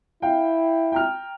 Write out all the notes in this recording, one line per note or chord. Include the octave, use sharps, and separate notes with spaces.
E4 F5 G5
G5 A#5 F6